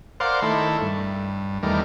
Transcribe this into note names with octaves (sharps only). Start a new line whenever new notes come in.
A#4 C5 D5 F5 F#5 C6
D#3 A3 E4 A4
G2
E2 D#3 G3 A3 A#4